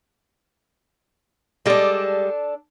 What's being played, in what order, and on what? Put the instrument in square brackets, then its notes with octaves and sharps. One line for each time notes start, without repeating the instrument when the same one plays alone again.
[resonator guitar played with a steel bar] G3 G#3 [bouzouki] D4 A4